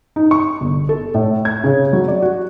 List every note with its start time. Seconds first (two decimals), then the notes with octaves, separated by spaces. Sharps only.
0.16 D#4
0.31 C#6
0.61 G1
0.89 A4
1.14 A2
1.45 G#6
1.64 C#3
1.93 F#3
2.08 D5
2.22 F#4